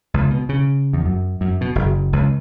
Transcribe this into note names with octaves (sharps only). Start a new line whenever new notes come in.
C#2
B2
C#3
E2
F#2
F#2
B2
F#1
C#2